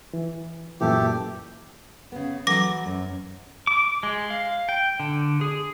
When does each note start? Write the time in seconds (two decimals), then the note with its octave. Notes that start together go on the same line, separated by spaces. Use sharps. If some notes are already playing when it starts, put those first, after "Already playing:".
0.14 E3
0.81 F#2 A#2 E3 A3 G4
2.12 C#3 B3
2.47 E3 F#3 A3 D6 A#6
2.86 F#2
3.67 D6
4.03 G#3
4.30 F5
4.69 G5
5.00 D3
5.41 G#4